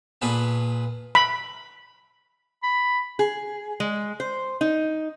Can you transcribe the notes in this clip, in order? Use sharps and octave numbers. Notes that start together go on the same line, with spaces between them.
A#2 G#4 B4 A5
B5
B5
G#4
G#3
C5
D#4